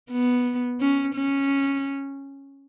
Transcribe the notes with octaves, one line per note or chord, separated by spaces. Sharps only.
B3
C#4
C#4